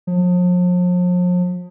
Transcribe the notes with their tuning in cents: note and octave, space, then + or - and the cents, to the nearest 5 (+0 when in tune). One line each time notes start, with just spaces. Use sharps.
F3 +40